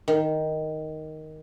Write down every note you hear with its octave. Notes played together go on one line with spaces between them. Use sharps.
D#3